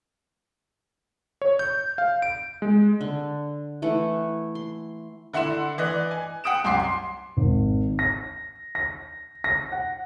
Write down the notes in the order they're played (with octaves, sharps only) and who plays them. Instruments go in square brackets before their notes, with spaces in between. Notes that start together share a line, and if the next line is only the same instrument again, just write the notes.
[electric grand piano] C#5
G6
F5
D7
G#3
[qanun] D3
E3 A3 F#5
C6
[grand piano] D3 E4 F#5 C6 E7
E3 D5 D#5 F#6
G#5
F#5 G5 D#6 D7 E7
C2 F#2 G5 C6 D6 C7
C6
G#1
A#6
A#6
A#6
F#5